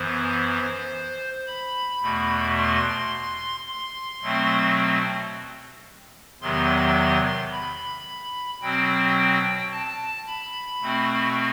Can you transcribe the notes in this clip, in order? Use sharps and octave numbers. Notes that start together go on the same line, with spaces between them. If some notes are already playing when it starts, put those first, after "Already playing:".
Already playing: F#2 E3 B3 C5
B5
E2 B2 A3
C6
C6
B2 F#3 A3 C4
E2 C3 D#3 F#3 B3 C6
B5
B2 F#3 C4 G5
A5
B5
B2 A3 C4